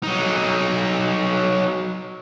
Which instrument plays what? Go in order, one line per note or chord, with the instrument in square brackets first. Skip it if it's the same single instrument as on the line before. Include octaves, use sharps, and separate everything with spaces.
[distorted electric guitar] F#3 D#4